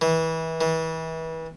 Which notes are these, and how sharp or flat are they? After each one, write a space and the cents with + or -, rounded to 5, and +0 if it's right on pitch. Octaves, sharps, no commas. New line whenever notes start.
E3 -25
E3 -30